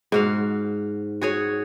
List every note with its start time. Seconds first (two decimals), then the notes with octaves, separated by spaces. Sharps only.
0.12 G#2 F#4 F5
1.22 F#4 G#4 C#5